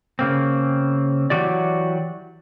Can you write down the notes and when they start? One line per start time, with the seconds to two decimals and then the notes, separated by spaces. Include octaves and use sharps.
0.19 C#3 A#3 C4
1.30 E3 F#3 F#4 G4 D5